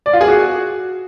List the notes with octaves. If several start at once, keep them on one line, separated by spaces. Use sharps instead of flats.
D5
F4
G#4
F#4